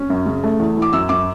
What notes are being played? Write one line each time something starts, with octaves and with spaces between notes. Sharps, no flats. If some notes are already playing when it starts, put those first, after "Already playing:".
Already playing: C#4
F#2
C#3
A3
E2
E3
D6
F#2 E6
F#2 D6